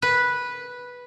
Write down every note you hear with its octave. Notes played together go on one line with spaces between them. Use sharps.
B4